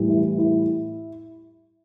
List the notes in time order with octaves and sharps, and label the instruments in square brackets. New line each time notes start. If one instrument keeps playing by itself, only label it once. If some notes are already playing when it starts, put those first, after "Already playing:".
Already playing: [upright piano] A2 E3 G3
E4
E4